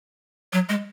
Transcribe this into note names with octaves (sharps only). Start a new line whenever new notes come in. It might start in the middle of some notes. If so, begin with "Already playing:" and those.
F#3
G#3